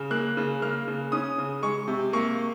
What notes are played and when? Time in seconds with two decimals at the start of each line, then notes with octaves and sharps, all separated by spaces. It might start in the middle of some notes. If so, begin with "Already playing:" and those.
Already playing: C#3
0.11 A#3 F#6
0.37 C#3
0.62 A#3 F6
0.88 C#3
1.12 C#4 D#6
1.38 C#3
1.62 G#3 C#6
1.88 C3
2.13 A#3 C#6